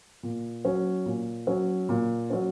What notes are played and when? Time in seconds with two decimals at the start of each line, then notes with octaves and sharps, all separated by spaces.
0.23 A#2
0.65 F#3 C#4
1.06 A#2
1.47 F#3 C#4
1.89 A#2
2.30 F#3 C#4